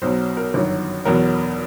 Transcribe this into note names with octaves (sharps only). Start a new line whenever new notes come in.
B1 B2 F#3 C5
A#4
G1 F#2 D#3 F#3
E2 B2 F#3 A#4